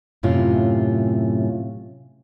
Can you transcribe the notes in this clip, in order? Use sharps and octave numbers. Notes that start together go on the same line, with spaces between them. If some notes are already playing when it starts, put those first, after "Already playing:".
F#2 A2 C3 C#4 F4